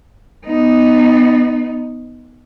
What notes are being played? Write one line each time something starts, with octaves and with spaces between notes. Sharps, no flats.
B3 D#4